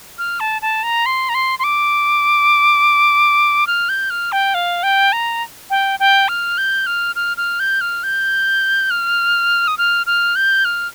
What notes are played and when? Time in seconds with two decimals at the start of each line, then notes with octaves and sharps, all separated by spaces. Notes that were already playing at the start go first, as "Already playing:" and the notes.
0.18 F6
0.40 A5
0.62 A5
0.83 A#5
1.06 C6
1.29 A#5
1.35 C6
1.59 C6
1.64 D6
3.67 F6
3.89 G6
4.10 F6
4.32 G5
4.54 F5
4.83 G5
5.13 A#5
5.70 G5
6.00 G5
6.29 F6
6.58 G6
6.87 F6
7.16 F6
7.37 F6
7.60 G6
7.81 F6
8.03 G6
8.90 F6
9.68 D#6
9.78 F6
10.07 F6
10.36 G6
10.65 F6